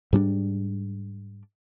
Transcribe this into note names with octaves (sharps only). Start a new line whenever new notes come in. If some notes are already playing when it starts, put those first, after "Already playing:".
G#2 G3 C#4 D4